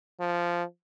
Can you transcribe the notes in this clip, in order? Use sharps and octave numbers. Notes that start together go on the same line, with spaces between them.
F3